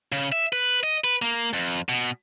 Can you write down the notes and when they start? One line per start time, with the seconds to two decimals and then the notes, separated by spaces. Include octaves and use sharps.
0.12 C#3
0.32 E5
0.53 B4
0.83 D#5
1.04 B4
1.22 A#3
1.53 F2
1.89 B2